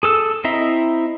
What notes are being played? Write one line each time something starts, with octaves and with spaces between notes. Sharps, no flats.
G#4 A4 E6
C4 E4 D#5 E5 A#5